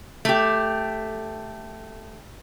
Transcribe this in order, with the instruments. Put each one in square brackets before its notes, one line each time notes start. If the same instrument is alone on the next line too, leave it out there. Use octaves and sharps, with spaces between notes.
[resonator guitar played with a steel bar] A3 G4